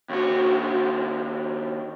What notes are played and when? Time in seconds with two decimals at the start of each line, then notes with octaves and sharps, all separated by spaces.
0.10 D#2 F#4